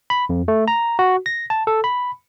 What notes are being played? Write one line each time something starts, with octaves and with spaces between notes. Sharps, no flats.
B5
F2
A3
A#5
F#4
A#6
A5
A4
B5